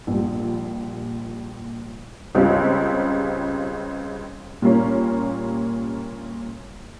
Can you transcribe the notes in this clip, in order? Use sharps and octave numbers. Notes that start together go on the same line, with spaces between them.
A#1 A#2 G3
C#2 C#3 G3 C4 F4
A#2 G3 A#3 C#4